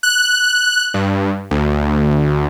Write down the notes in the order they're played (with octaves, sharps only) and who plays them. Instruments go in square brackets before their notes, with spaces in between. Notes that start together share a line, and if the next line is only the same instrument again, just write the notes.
[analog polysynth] F#6
G2
D2